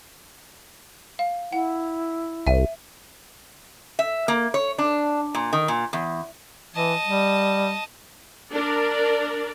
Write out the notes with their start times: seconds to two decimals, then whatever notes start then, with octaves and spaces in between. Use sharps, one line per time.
1.19 F5
1.52 E4 F#5
2.47 C2 E5 D#7
3.99 E5
4.28 A#3
4.54 C#5
4.78 D4
5.34 A#2
5.53 D#3
5.68 A#2
5.93 E2
6.74 E3 D#5 A5
7.06 G3
8.52 D4 A#4 D5